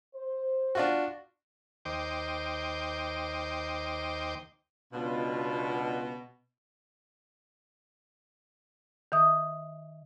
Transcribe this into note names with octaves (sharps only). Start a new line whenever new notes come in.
C5
D4 F4 F#4
D#2 C5 D#5 G5 D6
C#2 B2 D4 F4
D#3 E5 D#6